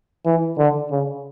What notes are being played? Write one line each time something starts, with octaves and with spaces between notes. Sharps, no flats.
E3
D3
C#3